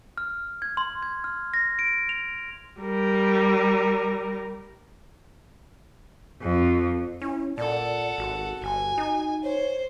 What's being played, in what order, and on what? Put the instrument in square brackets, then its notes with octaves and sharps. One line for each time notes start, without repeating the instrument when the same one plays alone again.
[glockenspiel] F6
G#6
C6
G#6
F6
A#6
D7
F7
[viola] G3 A#4
[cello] F2 F3
[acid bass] C#4 [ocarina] E4
[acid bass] A#2 [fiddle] A4 F#5 [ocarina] D5
[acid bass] G#1 [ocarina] F#4
[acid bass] G1 [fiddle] G#5
[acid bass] D#4
[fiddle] C5 [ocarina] C#5